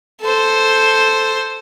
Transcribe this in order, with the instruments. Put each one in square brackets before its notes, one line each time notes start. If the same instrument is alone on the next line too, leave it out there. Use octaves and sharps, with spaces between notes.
[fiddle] A4 C5